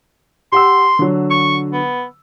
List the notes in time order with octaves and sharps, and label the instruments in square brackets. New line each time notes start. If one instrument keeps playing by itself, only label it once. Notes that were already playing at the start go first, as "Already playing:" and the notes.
[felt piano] G4 F#5 E6 [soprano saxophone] C6
[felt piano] D3 F#3
[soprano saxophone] C#6
B3